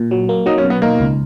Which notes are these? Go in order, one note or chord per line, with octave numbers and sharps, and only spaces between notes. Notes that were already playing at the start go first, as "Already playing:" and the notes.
Already playing: A#2
F#3
A#3
F#3 D#4
C#4
B2
B3
A#3 D#4
C#2